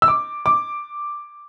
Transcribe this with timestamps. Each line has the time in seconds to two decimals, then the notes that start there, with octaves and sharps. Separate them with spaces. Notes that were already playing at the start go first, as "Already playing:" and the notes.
0.02 E6
0.08 D6
0.46 D6